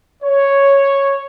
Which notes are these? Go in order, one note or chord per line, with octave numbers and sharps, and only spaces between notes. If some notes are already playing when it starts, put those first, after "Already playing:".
C#5